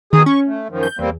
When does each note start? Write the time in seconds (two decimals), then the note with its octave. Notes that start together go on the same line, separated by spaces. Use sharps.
0.13 B2 D#3 G#4 D#6
0.26 C#4 C#6
0.46 A3
0.70 F#2 D#3 F3
0.83 G6
0.99 E2 G3 A#3 C4